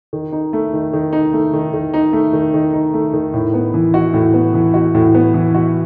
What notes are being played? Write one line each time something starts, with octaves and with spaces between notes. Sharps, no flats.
D#3
D#4
A3
D#3
D#3
D#4
A3
D#3
D#3
D#4
A3
D#3
D#3
D#4
A3
D#3
A2
B3
E3
F#4
A2
B3
E3
F#4
A2
B3
E3
F#4